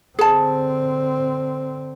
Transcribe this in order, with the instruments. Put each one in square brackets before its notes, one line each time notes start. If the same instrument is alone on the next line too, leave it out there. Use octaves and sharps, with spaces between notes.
[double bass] D3 C4 [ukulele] G#4 A5